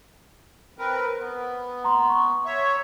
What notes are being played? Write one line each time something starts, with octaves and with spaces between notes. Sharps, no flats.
C4 A#4 B4
B3
A#5 C6
C#6
C#5 E5